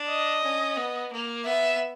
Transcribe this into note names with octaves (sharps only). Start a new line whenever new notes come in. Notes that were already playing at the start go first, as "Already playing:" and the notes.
Already playing: D4
D#5
C#4
B3
A#3
B3 E5